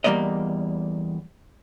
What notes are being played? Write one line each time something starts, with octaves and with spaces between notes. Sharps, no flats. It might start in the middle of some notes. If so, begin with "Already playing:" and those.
E2 C3 G3 A#3 D5 D#5